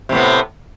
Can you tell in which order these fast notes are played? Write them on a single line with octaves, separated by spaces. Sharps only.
C3 A2 B3